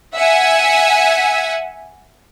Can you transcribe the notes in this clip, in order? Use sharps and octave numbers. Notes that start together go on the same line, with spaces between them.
E5 F#5 G#5